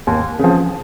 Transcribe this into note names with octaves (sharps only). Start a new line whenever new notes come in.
D#2
C#3 F3